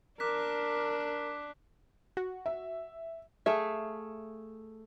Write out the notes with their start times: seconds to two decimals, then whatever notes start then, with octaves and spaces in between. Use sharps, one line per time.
0.20 D4 A#4 D6 F#6 B6
2.17 F#4
2.46 E5
3.46 A3 G#4 E5 F5